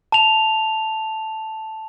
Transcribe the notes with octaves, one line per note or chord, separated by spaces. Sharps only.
A5 F7